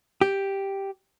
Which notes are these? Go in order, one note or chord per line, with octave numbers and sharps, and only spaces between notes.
G4